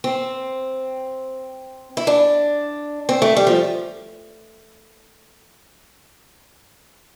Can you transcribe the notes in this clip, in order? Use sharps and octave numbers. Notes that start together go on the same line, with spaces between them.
C4
E4
D4
C4
A3
G3
F3